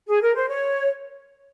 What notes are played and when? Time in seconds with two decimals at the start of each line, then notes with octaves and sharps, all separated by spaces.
0.08 G#4
0.22 A#4
0.35 C5
0.48 C#5